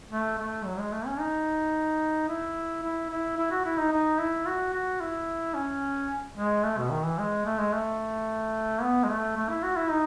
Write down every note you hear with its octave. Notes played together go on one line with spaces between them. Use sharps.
A3
A3
F#3
G#3
A3
C#4
D#4
E4
E4
E4
E4
F#4
E4
D#4
D#4
E4
F#4
F#4
E4
C#4
G#3
A3
B2
D#3
E3
G#3
A3
G#3
A3
B3
G#3
A3
A3
E4
F#4
E4
D#4